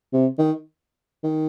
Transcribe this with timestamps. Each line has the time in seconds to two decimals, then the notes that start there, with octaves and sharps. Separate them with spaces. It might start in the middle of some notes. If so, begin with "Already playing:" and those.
0.13 C3
0.38 D#3
1.24 D#3